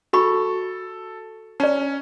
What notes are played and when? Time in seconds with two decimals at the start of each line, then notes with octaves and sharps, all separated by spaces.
0.13 F#4 A4 B5 C#6
1.60 C#4 D5 A#5